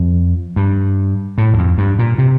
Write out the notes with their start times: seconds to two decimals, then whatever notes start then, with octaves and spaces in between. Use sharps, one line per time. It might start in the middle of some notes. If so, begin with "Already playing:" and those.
Already playing: F2
0.56 G2
1.38 A2
1.54 E2
1.58 F2
1.78 G2
1.99 A#2
2.18 C3